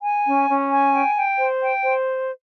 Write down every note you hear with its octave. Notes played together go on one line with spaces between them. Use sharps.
G#5
C#4
C#4
G#5
G5
G5
C5
G5
C5